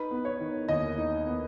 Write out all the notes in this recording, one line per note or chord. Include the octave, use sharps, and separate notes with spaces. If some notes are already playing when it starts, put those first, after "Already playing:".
Already playing: D#4 B4
B3
C#5
D#3
D#2 D#5
D#4
B3